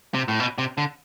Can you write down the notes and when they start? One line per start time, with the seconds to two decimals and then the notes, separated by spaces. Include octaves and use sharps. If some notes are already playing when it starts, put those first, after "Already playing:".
0.14 C3
0.28 A2
0.40 B2
0.58 C3
0.78 D3